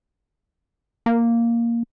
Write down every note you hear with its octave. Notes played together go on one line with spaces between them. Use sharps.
A#3